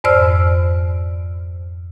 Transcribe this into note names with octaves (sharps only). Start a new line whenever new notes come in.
F2 G#2 C5 D5 E6 F6